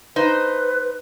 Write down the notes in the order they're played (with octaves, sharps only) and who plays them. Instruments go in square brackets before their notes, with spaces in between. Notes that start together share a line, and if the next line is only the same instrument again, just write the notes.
[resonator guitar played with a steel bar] D#4 C5 [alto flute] B4